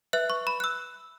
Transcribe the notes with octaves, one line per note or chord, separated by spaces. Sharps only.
B4 E5 F#6
C#6
B5
F#6
E6